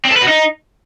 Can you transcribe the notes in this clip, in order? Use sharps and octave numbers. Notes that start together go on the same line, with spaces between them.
C4
A4
B4
F#4
D#4